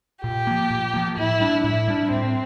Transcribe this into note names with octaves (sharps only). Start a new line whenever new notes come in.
A#2 G4
F3 A#3
A#2
F3 A#3
A2 E4
G3 D4
A2 E4
G3 D4
A2 C4